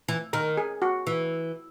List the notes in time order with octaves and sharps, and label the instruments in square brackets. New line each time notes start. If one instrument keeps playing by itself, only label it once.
[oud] E3
[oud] D#3 [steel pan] A#4
[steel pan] G#4
F#4
[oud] E3